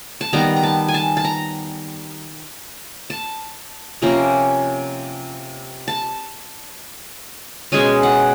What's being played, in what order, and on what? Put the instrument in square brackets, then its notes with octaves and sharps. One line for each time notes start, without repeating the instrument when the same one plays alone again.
[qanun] A5
D#3 G3 B3 A#5
A#5
A5
G#5
A5
A5
A#5
A5
C3 F3 A#3 C#4 A#5
A5
B2 G#3 C#4 G#5
F#5